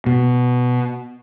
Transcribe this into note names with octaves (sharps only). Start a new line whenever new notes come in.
B2